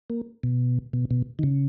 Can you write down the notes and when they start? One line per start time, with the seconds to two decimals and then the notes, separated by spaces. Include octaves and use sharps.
0.10 A#3
0.43 B2
0.93 B2
1.11 B2
1.39 D#3
1.43 C#3